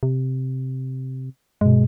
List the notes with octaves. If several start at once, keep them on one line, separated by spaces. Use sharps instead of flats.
C3
G2 B2 G#3